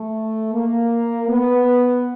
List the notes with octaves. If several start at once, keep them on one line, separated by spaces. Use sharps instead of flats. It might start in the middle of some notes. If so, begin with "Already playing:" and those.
Already playing: A3
A#3
B3